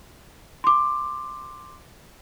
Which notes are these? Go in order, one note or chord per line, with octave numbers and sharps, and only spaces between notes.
C6 D6